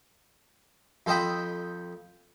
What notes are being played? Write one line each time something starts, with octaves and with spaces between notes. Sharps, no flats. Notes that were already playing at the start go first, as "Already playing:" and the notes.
F2 A4 C5 D#5 G5 B5